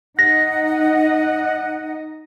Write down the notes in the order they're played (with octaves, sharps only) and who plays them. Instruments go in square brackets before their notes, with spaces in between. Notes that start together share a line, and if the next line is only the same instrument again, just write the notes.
[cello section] D#4 D#5 [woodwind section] F#5 [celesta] A#6